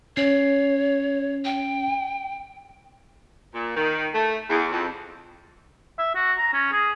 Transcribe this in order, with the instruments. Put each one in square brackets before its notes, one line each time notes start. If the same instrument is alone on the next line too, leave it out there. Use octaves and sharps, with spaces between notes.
[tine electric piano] C#4 C7 [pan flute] C#5
[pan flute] G5
[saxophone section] A#2
D#3
A3
E2
F2
[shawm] E5
F#4
A#5
C#4
G#4